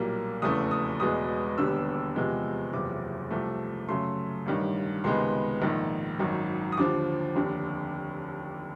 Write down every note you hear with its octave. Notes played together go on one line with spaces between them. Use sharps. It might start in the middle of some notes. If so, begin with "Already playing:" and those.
Already playing: B1 A#2 G3 A#3
F1 E2 C#3 E3 A3 D#6
D#6
E1 E2 B2 G#3 B3 D#6
E1 D#2 D3 G3 B3 E6
E2 C3 F3 G#3 B3
F#1 E2 C3 F3 D6
C2 C3 F3 A3
F#2 C#3 F#3 A3 C6
A1 G2 D#3
C#2 C3 D#3 G#3 B3 C6
A#1 G#2 D#3
G#1 F#2 D#3
D#6
D#2 D3 F3 D6
F1 D#2 D3